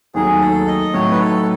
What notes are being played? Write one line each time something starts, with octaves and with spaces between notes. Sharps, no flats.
D#2 D#3 F#3 A3 G#4
A4
D#5
A2 F#3 A3 D#4 C#5
B4
A4